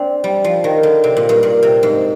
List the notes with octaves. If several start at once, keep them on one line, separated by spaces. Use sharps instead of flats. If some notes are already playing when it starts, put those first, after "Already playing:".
Already playing: C4 D4
G3
F3
D#3
D3
C3
A#2
G2
A#2
C3
G#2